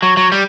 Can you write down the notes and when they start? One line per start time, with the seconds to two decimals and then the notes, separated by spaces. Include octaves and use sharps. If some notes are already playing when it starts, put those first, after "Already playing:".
0.02 F#3
0.17 F#3
0.32 G3